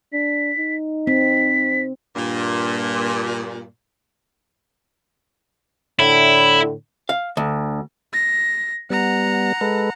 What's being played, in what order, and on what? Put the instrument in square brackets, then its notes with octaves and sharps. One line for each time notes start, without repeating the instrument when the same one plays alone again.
[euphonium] D4 [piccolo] B6
[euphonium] D#4
[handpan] C4 [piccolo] B6
[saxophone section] G2 A#2
[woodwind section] A2 D3 [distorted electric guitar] E4
[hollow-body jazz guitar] F5
D2
[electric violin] A#6
[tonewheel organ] G3 B3 [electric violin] F#5 A#5
[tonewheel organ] G#3 A4 B4